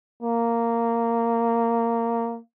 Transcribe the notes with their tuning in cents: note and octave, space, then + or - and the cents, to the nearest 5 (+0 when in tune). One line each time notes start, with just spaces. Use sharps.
A#3 -10